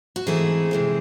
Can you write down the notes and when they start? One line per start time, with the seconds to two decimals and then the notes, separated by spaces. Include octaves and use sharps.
0.16 F#4
0.27 G#2 E3 A3 C4 E4 G#4
0.71 C3 E3 G#3 C4